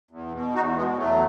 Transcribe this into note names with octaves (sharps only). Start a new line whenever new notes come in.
E2
B2
E2 D#4 F#4
B2 G#3 B3
E2 F#3 A3